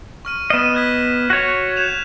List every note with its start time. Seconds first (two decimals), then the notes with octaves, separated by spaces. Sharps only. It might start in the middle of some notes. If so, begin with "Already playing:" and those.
0.25 C#6 F6 D#7
0.50 B3 D#5 F6 E7
0.75 F#6 G#6 B6
1.30 F#4 C#5
1.77 G6 E7 F7